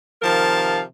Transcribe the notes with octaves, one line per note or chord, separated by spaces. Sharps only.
C3 D#3 F3 A#4 F5 A5